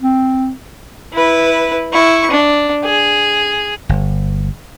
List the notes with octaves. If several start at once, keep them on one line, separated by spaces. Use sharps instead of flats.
C4
E4 B4
E4 C#6
D4
G#4
G1